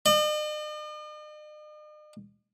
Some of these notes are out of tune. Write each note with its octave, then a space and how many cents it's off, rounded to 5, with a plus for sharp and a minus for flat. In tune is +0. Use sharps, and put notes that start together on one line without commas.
D#5 -45